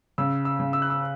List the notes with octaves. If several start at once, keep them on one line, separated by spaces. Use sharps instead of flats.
C#3 E6
E6
C#3
E6
F#6
E6